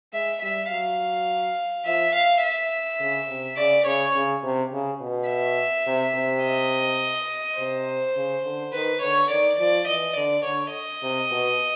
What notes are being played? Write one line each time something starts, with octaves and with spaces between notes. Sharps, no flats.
G#3 E5
G3 E5
F#3 F5
F3 E5
F5
E5
C#3
C3
C#3 D5
C#3 C#5
C#3
C3
C#3
B2
E5
C3
C3
D#5
C3 C5
C#3
D3
D#3 B4
D3 C#5
D#3 D5
F3 D5
E3 D#5
D3 D5
D3 C#5
D#5
C3
B2